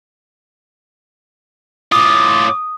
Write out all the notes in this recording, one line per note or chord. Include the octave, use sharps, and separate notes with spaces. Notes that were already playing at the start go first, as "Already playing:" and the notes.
A2 F4 D6 D#6